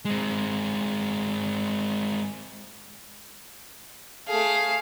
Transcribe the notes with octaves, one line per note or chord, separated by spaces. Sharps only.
G#3 C4
A3 G#4 F5